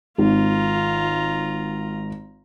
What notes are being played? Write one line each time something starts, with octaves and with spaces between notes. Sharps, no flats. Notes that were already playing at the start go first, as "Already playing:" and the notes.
G#1 F4 A#5